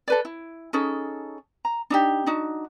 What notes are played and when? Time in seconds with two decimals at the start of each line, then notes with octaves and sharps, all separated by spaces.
0.08 A4 B4 D5
0.25 E4
0.73 C#4 D#4 G#4 A4
1.65 A#5
1.90 D4 D#4 G4
2.26 D4 D#4 F#4